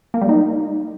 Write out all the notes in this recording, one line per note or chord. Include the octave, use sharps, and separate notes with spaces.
A#3
G3
D#4